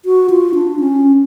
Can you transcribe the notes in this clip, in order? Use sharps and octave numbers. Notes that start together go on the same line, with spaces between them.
F#4
F4
D4
C#4